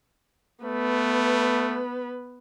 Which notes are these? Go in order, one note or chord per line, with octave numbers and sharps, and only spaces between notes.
A3 B3 B4